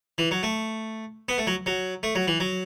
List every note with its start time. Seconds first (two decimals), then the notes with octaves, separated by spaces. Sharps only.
0.18 E3
0.31 F#3
0.43 A3
1.29 B3
1.38 A3
1.47 F#3
1.66 F#3
2.03 A3
2.15 F#3
2.28 E3
2.40 F#3